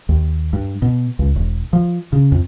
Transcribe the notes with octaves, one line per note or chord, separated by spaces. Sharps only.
D#2
G2
B2
C#2
E1
F3
C#3
F2